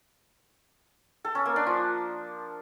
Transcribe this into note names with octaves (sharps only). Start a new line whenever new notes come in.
A4
C#4
A#3
D4
F3